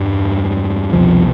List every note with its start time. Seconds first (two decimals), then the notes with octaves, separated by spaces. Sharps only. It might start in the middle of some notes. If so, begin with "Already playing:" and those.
Already playing: E2 G2 B2 G3
0.93 C2 F2 B2 F3